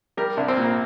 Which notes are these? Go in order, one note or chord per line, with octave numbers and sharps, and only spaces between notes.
G3 A#4
C2 D4
C4
A#2 A#3